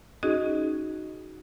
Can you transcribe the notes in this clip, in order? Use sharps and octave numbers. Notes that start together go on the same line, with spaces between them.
C#4 D#4 F#4 G#4 D#5